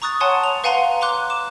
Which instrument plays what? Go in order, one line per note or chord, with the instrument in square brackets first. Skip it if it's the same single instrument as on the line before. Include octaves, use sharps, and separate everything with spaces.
[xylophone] A#5 C#6 D#6 F#6 A6
C#5 F#5 G#5 A5 C6
F7
B4 F5 F#5 G#5 A#5 C6
A#5 C6 D6 F#6
D6 E7